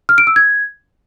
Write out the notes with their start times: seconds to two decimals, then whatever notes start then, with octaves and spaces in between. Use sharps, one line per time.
0.09 F6
0.18 D7
0.27 E6
0.36 G#6